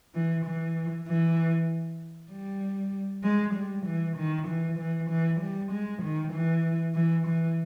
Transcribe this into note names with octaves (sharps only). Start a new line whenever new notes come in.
E3
E3
E3
G3
G#3
G3
E3
D#3
E3
E3
E3
G3
G#3
D#3
E3
E3
E3